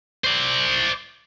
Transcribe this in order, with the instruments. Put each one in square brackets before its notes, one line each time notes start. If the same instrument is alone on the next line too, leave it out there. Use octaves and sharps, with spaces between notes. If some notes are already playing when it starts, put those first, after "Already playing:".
[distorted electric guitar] C5 D5